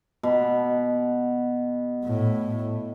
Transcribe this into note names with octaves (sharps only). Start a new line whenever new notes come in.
B2
A2